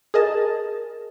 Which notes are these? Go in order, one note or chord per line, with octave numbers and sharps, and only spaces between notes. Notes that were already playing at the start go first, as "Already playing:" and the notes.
G#4 A#4 D#5 A5